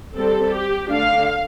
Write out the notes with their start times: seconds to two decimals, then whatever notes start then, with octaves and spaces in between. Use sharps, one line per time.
0.16 G3 C4 A4
0.54 G4
0.91 D3 A3 D4 F5